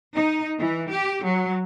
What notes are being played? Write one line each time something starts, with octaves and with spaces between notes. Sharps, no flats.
D#4
E3
G4
F#3